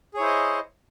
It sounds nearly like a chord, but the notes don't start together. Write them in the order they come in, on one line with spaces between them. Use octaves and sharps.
G#4 C#5 E4 C5 D#5